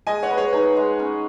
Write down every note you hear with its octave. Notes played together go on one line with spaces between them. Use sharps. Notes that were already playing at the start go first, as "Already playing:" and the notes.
G#3 D#5 G#5
C#5 F#5
B4
G#4 C#5
D#4 G#4 C#5
G#3
C#4